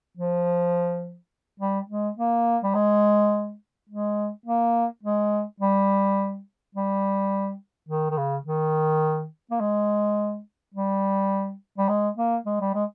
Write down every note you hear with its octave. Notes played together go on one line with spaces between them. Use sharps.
F3
G3
G#3
A#3
G3
G#3
G#3
A#3
G#3
G3
G3
D#3
D#3
C#3
D#3
A#3
G#3
G3
G3
G#3
A#3
G#3
G3
G#3